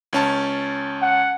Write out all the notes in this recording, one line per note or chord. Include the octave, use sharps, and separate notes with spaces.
C#2 C#4 A5
F#5